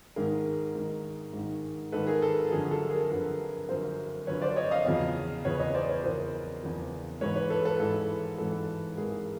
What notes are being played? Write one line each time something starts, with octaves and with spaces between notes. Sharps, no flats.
G#2 D#3 G#4 A#4
G#2 D#3
G#2 D#3
G#2 D#3 A4 B4
G#4 A#4
A4
F#2 D3 F3 G#4
A4
G#4 A#4
F#2 D3 F3 A4 B4
F#2 D3 F3 A#4 C5
F#2 D3 F3 B4 C#5
C5 D5
C#5 D#5
D#5 F5
E2 C#3 F3
E2 C#3 F3 B4 C#5
C#5 D#5
C5 D5
B4 C#5
E2 C#3 F3 A#4 C5
E2 C#3 F3
G#2 E3 B4 C#5
B4 C#5
A4 B4
A4 B4
G#2 E3 A4
G#2 E3 A4
G#2 E3 G#4 A#4